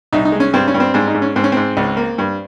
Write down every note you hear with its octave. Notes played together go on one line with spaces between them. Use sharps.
C2 D#4
D#4
G#3
C#4
G2 C4
C#4
G2
C4
G#2 C4
D#4
G#2
C#4
G#2 C4
C#4
G#2 C4
C#2
A#3
G2